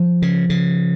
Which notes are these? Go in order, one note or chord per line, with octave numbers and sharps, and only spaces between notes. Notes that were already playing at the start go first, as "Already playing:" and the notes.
Already playing: F3
C#3
C#3